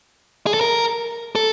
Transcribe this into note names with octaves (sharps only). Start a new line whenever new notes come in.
G#4
A4
A#4
A4